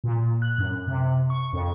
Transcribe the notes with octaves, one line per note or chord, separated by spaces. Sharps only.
A#2
F#6
F#2
C3
C#6
F2